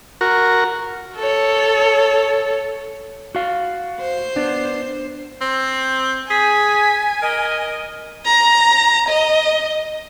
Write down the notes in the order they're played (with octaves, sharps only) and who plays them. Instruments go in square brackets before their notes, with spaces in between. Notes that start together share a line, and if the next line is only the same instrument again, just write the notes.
[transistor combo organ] F#4 A#4
[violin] A4 C#5
[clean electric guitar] F#4 F5
[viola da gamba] C5
[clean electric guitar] B3 D4
[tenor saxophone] C4
[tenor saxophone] G#4 [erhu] G#5 [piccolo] B6
[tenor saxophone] A#4 [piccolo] D#5
[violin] A#5
D#5